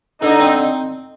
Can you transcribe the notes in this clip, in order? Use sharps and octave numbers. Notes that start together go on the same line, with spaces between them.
D3 D#4
C4